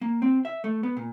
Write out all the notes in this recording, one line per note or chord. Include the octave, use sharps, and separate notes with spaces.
A#3
C4
E5
A3
B3
A#2